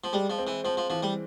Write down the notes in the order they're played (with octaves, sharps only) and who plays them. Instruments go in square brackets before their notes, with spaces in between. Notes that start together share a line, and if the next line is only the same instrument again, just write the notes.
[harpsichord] F3
[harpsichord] G3 [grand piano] G#3
[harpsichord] F3
[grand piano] C4
[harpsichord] E3
[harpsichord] F3 [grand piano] C4
[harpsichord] F3
[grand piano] E3 [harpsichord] F3
[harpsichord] G3